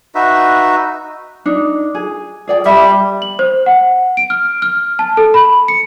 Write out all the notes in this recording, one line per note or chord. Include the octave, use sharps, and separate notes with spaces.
D#4 F#4 B4 E5
D4 D#4
G#4
G#4 D5 G5
G3 D5 E5 G5
F#7
C5
F#5
D7
F6
F6
A5
A4
B5
C#7